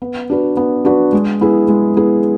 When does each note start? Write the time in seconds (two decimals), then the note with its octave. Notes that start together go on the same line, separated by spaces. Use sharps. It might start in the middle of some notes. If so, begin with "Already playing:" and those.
0.02 B3
0.30 D4 F#4 B4
0.57 B3
0.85 D4 F#4 B4
1.13 G#3
1.41 B3 E4 G#4
1.68 G#3
1.97 B3 E4 G#4